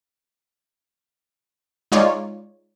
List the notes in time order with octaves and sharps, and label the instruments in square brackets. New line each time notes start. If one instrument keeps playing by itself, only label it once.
[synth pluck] G#3 D#4 F4 C#5 D5